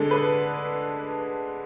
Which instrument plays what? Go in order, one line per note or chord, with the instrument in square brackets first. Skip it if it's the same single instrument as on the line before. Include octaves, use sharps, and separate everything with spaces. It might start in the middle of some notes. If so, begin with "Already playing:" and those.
Already playing: [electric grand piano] D3 G#3 D4 G#4 [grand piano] A4
[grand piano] B4